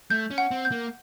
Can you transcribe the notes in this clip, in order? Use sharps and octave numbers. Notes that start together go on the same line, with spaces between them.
A3 G6
C#4
F#5
C4
G6
A#3